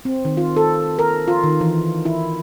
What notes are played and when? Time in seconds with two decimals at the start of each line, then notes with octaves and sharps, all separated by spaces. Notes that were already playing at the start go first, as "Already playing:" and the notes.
0.05 C4
0.25 D#3
0.37 F4
0.57 A4
0.99 A#4
1.28 F4
1.44 D#3
1.61 E3
2.05 E4